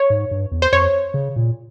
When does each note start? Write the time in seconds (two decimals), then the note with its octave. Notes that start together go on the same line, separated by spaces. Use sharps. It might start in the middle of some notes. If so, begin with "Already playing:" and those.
Already playing: C#5
0.10 G#2
0.31 G2
0.52 E2
0.62 C5
0.73 F2 C#5
1.14 C#3
1.36 A#2